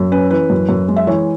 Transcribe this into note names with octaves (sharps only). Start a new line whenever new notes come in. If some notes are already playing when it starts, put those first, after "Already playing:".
Already playing: F#2
C#4 B4
E3 B4
F#2
F#2
G#3
E5
E3 C#5